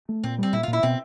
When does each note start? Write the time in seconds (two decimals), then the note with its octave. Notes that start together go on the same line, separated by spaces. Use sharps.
0.09 A3
0.23 A#2 C4
0.38 G3 C4
0.53 A#2 E4
0.63 F4
0.68 A#2
0.73 E4
0.83 B2 C4